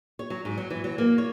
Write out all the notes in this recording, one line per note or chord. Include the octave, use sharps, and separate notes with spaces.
C#5
F#3
G#2
F#3
E3
F#3
A#3
C#5